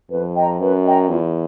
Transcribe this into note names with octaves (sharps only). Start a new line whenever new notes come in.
F2 B4
D#5 G5 A#5
F#2 B4
D#5 G5 A#5
E2 F4